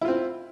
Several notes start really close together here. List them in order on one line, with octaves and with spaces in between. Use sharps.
E4 F4 C4